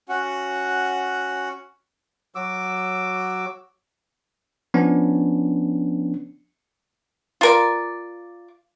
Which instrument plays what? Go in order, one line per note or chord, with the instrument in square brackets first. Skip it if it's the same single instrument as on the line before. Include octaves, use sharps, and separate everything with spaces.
[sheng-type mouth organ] C#4 F#4 F#5
[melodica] F#3 F#4 D6 E6
[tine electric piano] F3 B3 C#4 D4
[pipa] F4 A#4 D5